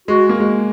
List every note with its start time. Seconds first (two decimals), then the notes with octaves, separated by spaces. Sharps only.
0.08 G#3 F#4
0.29 A#3
0.40 G#3